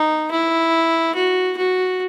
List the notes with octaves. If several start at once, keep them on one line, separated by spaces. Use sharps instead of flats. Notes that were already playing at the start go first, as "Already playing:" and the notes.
Already playing: D#4
E4
F#4
F#4